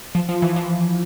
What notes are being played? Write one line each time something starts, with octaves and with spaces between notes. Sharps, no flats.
F3
F3
E3
F3